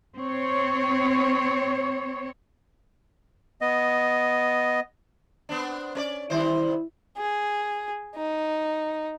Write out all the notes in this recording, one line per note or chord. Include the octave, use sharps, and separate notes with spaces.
C4 C#5
B3 D#5
B3 C4 D4
C#4 A#4 D5
D#3 G3 E4 C5
G#4
D#4